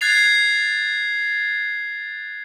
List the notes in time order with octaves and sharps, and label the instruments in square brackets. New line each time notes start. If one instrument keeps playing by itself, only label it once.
[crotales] F#6 G#6 A6 C7 F7